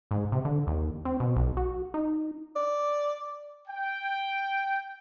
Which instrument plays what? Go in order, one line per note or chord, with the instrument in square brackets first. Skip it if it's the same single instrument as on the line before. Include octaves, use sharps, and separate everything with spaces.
[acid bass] G#2
C3
D3
D#2
C4
B2
B1
F#4
D#4
[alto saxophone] D5
[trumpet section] G5